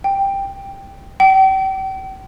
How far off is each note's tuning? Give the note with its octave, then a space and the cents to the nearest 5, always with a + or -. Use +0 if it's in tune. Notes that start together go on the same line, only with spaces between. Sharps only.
G5 +10
G5 -35